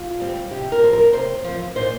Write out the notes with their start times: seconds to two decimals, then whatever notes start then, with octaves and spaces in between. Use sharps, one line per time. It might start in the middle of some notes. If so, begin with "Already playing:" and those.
Already playing: F4
0.20 G3 C4
0.51 C3 G4
0.72 A#4
0.83 F3 C4
0.93 A#4
1.13 C3 C5
1.44 F3 C4
1.76 A#2 C5